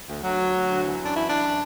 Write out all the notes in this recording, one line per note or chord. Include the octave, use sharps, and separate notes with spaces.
D2
D2 F#3
D2
D2
D2
E3
F#2 D4
E3 E4
F#2 D4
E3